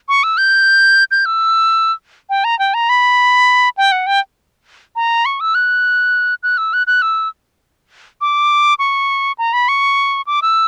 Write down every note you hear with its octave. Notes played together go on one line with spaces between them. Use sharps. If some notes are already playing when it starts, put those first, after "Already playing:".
C#6
E6
G6
G6
E6
G5
A#5
G5
A#5
B5
G5
F#5
G5
A#5
C#6
E6
F#6
F#6
E6
F#6
F#6
E6
D6
C#6
A#5
B5
C#6
D6
E6